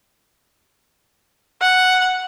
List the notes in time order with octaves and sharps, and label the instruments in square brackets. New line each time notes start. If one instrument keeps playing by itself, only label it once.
[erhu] F#5